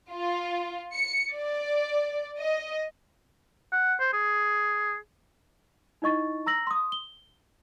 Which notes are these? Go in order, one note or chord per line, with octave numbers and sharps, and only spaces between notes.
F4
C#7
D5
D#5
F#5
C5
G#4
D#4 E4 D#5 C#6 A6
A#5 E6 A#6 F#7
C6 D#6
G7